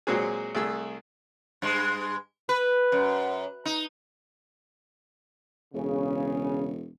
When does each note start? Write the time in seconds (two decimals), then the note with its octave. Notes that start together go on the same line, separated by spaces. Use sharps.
0.07 A#2 F#3 G#3 C4 F#4 G#4
0.55 C2 A3 G#4 E6
1.62 G2 G#3
2.49 B4
2.92 F#2
3.65 D#4
5.74 E1 C#3